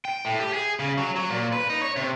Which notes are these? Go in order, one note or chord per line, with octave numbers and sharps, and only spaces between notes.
G5
A2
G4
G#4
C#3
F#3
F#3
A#2
B4
D#4
C#5
C3